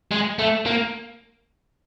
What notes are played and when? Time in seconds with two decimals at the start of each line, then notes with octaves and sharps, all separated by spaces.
0.11 G#3
0.39 A3
0.66 A#3